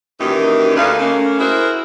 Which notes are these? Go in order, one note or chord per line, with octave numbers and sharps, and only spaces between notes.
F#2 A#2 D#3 E3 D#4 G4
D2 D3 D#4 A#4 B4 F5
A3 A#3 C#4
E4 F#4 G#4 A#4 C5 E5